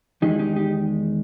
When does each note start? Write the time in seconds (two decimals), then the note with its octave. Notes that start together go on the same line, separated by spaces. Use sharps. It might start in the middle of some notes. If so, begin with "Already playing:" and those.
0.22 E2 D#3 G#3 D#4 G4
0.31 E4
0.39 D#4 G4
0.56 D#4 G4